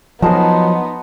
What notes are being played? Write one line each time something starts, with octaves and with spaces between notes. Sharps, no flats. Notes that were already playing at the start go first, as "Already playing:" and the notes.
F3 F#3 B3 D#4 F#4 D#5 A5 C6